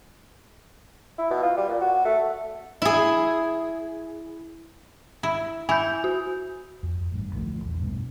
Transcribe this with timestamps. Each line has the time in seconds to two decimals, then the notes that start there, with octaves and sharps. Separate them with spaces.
1.18 E4
1.30 B2
1.43 F4
1.57 G3
1.69 A#2
1.81 F#4
2.05 A3
2.82 E4 G#4
5.23 E4
5.69 E4 G#5 G6
6.04 F#4
6.83 F2
7.12 A1 G2
7.33 A1 D2 F3 A3
7.65 A#1 E2
7.81 G2 B2